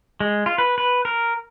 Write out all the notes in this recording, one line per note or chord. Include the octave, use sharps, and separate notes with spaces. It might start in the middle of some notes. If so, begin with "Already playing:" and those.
G#3
F4
B4
B4
A#4